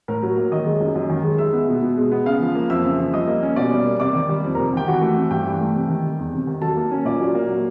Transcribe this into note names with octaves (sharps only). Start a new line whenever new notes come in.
A2 A#4 A#5
F#3
A#3
D#3 D#5 D#6
G#3
F#2
F#2
D#3
G#3
G#3 E5 E6
B3
B2
B2
G#3
B3
C#3 F5 F6
F3
A#3
F2 E5 E6
C#3
F3
G3 D#5 D#6
A#3
C#4
B2 D5 D6
G3
A#3
C3 D5 D6
D#3
G3
F2
C3 A#4 A#5
D#3 G4 G5
E3 F#4 F#5
A3
C4
G2 G4 G5
E3
A3
C3
D#3
G3
E2
C3
D#3
F#3 A4 A5
A#3
C#4
A#2 D5 D6
F#3
A#3
F#3